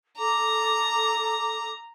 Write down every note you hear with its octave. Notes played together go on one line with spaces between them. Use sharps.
A4 A#5 D6